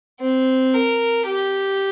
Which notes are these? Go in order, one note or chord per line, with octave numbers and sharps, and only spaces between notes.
C4
A#4
G4